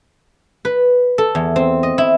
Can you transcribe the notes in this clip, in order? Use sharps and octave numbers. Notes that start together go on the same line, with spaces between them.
B4
A4
E2
C4
D#5
E4